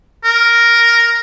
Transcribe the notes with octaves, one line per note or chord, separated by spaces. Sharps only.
A#4